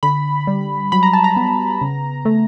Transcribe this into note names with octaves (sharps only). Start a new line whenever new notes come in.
D3 B5
G3
F#3 B5
A#5
A5
A#5
B3
C#3
A3